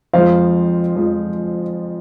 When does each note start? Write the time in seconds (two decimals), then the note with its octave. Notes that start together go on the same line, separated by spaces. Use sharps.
0.13 F2 F3 G#3 C5 F5
0.96 F2 F3 G#3